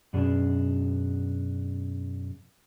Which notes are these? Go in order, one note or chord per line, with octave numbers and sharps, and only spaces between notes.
F#2 B2 C#4 D4 G#4